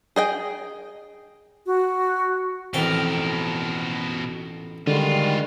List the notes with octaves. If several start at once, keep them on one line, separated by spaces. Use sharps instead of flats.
G#4 D#5 G5
F#4
A1 F2 B2 A#4 G5
D3 D#3 G3 G#3 F4 F#4